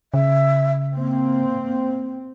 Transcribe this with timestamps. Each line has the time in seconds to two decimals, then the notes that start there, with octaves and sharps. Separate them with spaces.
0.14 C#3 E5
0.94 A#3 C4